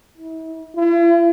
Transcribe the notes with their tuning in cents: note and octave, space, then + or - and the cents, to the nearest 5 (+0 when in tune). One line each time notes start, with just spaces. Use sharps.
E4 -40
E4 +45